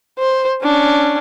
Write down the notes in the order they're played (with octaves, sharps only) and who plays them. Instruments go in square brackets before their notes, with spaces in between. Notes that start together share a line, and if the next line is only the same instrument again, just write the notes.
[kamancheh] C5
C#4 D4